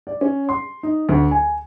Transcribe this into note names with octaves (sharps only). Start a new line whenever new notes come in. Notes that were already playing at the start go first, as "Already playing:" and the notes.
D5
C#4
C6
D#4
D2
G#5